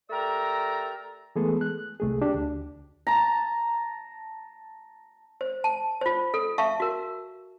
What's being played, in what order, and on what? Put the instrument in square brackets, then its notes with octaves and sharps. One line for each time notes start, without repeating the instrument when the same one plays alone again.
[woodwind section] A3 G4 A#4 D5 A#5 E6
[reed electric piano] E3 G#3 A3 B3 G#4 A4
F#6
C2 A3 G#4
D4 G4
D2
[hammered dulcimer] A5 A#5
[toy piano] C5
A5
F4 C5
A4
E5 F5 A5 C#6
F#4 A#4